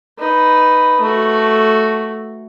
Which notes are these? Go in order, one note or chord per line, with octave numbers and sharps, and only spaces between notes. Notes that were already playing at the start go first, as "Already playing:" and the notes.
D#4 B4
A3 F#4